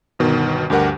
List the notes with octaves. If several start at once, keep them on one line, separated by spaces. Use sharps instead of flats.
G1 B2 D#3
D2 G2 G4 A#4 F#5